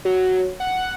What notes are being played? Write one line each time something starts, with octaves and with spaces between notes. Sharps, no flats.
F#3
F#5